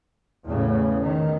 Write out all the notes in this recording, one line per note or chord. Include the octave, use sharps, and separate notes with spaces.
E2 A2 C#3
D#3